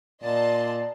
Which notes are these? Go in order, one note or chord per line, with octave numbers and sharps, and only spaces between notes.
A#2 D5 D#5 A5 C6